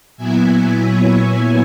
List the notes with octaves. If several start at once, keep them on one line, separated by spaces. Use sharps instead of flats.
A#2 F#3 B3 E4 E5 G#5
C#5 E5